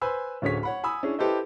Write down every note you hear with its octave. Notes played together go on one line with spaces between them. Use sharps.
B4 C5 G#5 B5 E6
D1 D3 C#4 G#4 C#5 B6
C#5 F#5 B5
G#5 B5 D#6 E6
C#4 D4 E4 G#4
E4 G4 A4 B4 C5 D#5